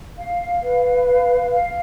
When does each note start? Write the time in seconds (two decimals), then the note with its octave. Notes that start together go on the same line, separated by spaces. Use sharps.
0.18 F5
0.62 B4
1.06 F5
1.50 F5